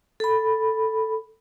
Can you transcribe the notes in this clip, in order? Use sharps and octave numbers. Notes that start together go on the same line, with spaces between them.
A4 B5